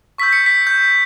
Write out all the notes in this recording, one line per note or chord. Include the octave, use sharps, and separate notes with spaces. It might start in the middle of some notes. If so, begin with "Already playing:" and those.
C#6 E6 G6 B6
C#7
B6
G6